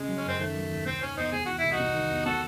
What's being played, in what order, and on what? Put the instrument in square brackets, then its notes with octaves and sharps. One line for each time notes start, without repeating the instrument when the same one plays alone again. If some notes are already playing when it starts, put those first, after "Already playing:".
Already playing: [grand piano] C#3 [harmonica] G#3
[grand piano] F#3
[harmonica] C#4
[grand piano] F#2 [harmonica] C4
[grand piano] D#3 [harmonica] A3
[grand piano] F#3
D#2
[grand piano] C3 [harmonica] C4
[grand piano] D#3 [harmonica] C#4
[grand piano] E2 [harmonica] C4 D#4
[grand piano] C3 [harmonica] G#4
[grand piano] E3 [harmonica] F#4
[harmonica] E4
[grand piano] C2
[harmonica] D#4 F#4
[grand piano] C3
D#3
E2
[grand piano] C4 [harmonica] F#4 A4